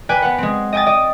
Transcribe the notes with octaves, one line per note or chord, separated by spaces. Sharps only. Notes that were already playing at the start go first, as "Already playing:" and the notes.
B4 D5 G5 G#5 B5 F#6
B3 B4 F#5
G#3 C4
D#5 G5 G#5 D#6 A6
D5 D#5